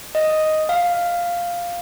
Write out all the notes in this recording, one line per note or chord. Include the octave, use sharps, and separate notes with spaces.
D#5
F5